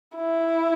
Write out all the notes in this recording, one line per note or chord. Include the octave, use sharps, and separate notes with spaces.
E4